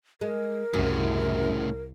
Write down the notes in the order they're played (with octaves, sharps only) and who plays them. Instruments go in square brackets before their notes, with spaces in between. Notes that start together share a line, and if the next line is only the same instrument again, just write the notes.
[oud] G#3 [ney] A#4
[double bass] C2 [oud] F#2 [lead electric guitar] A2 C#3